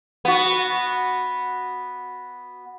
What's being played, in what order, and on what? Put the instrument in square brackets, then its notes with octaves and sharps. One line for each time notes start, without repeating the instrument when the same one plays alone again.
[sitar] B3 F#4